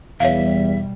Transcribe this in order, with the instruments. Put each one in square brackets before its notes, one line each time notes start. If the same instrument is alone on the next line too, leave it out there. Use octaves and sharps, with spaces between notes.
[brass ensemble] E2 [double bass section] B2 G3 [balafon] C#5 F5 [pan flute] E5